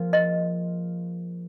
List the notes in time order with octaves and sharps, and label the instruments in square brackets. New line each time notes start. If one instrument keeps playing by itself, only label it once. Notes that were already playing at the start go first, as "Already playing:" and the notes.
Already playing: [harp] F3 A#3 F4 G#4
[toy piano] D#5